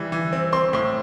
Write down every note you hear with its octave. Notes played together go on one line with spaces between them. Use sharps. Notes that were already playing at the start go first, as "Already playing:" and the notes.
Already playing: E3 G3
E3
C4
C4 C6
A2 C6